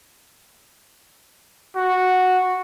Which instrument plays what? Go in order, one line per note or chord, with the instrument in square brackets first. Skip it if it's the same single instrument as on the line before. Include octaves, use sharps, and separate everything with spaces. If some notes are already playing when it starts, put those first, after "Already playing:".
[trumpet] F#4